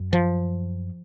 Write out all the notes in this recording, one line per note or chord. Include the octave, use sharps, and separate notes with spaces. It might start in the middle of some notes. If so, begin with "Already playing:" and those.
Already playing: F#2
F3